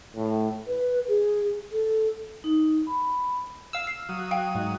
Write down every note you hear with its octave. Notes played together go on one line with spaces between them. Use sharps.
A2
B4
G#4
A4
D#4
B5
F5 E6
C7
F#3 D#6
F5 G5
G#2